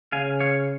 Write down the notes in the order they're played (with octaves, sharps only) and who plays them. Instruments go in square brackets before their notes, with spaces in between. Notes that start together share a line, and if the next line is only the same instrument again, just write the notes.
[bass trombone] C#3 [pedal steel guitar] F5 G#5
[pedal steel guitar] C#5 F5